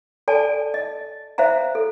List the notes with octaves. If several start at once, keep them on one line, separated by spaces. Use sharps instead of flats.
A4 D5 G#5 A5
D#5
C5 E5 F5 A#5
A4